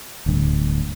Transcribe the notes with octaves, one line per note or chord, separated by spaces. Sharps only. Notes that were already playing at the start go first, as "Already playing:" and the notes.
D1 D2 G2